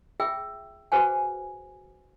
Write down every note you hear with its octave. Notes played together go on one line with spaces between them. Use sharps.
F4 G#4 E5 G5 E6
F#4 G#4 B4 C5 F#5 G#5